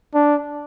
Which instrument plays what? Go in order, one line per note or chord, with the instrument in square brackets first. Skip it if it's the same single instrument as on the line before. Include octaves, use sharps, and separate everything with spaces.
[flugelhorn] D4